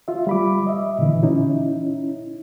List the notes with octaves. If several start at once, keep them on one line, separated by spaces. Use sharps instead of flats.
F4 E5
G3 B5 D6
D#5 E5
A#2 D3 E3
C#4 D#4 E4